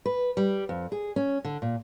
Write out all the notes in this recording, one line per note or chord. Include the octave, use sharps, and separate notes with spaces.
B4
G3
F2
G#4
C#4
D3
A#2